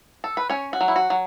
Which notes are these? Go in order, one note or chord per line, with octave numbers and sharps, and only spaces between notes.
A4
B4
C#4 C#5
F#4
F#3
E4
F#4
F#3